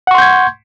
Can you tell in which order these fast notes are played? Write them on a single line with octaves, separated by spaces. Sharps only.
F#5 C#6 C6 G6 G#6